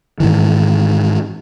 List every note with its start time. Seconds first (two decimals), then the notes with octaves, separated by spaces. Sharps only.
0.20 G#2 D#3 E3